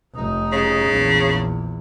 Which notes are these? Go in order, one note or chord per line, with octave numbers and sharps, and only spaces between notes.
F1 D#4
C#3
A#1 E2